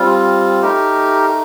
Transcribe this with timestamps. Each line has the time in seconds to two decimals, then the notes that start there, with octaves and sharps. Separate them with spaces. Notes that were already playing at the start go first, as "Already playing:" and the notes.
Already playing: G3 C4 F4
0.62 A3 D#4 G4 A#4